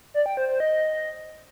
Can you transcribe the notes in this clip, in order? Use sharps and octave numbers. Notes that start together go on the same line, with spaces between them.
D5
G5
C5
C5
D#5